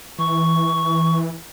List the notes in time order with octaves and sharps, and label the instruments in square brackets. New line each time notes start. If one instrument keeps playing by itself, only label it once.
[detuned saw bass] E3 [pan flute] C#6